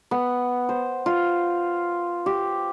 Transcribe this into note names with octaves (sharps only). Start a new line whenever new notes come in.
B3
C5
F4
G4